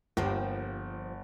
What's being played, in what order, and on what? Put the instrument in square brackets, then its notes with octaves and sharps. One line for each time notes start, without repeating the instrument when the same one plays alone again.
[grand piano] G1 [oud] F3 A#3 G4